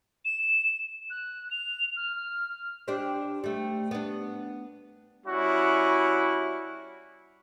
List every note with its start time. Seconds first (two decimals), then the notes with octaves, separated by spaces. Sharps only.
0.25 E7
1.10 F#6
1.51 F7
1.96 F6
2.16 F6
2.88 D4 G4 C5
3.44 G3 A3
3.91 B3 D4
5.26 G3 C#4 E4 F#4